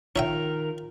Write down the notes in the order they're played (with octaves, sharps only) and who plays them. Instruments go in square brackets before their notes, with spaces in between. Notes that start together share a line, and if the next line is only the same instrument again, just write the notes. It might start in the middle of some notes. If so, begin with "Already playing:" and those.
[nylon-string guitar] D#3 [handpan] F4 [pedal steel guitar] A#4 [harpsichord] C#5 E5 G5